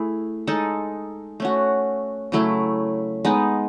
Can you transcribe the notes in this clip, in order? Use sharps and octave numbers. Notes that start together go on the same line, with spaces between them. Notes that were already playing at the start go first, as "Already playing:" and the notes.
Already playing: A3 E4 G#4
G#3 D#4 A4
A3 C#4 F#4
C#3 F#3 A3 E4
G#3 B3 D#4